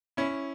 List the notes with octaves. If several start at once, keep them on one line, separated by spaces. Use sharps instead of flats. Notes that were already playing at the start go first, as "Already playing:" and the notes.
C#4 E4